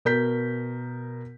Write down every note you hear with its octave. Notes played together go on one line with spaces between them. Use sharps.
B2 A#4 G6 B6